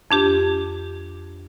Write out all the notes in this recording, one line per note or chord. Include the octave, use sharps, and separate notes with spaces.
F2 D4 G4